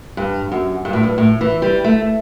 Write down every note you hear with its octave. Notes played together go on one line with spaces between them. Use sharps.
G2
F#2
G2
A2
G2
A2
E3
G3
A3